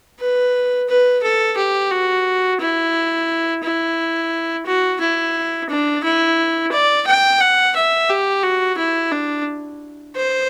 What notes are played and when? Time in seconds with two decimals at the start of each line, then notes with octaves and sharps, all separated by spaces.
0.20 B4
0.89 B4
1.23 A4
1.57 G4
1.91 F#4
2.61 E4
3.64 E4
4.66 F#4
5.01 E4
5.69 D4
6.04 E4
6.71 D5
7.07 G5
7.40 F#5
7.76 E5
8.09 G4
8.43 F#4
8.78 E4
9.12 D4
10.16 C5